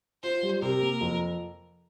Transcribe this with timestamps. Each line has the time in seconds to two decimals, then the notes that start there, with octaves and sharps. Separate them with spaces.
0.23 F4 C5
0.43 G3
0.62 C3 A#4
0.81 A#3
1.01 F2